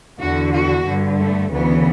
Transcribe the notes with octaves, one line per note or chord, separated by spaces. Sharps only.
E2 D3 F#4
F#4
G2 D3
A3
D2 C#3 E3 B3